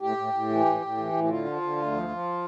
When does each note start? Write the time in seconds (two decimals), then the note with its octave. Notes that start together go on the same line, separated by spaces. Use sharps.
0.01 A2 G4
0.17 A2
0.33 A2
0.49 E3
0.65 A2
0.82 A2
0.97 E3
1.13 A2
1.24 G4
1.29 D3 F4
1.45 F3
1.62 D3
1.77 D2
1.93 F3
2.09 F3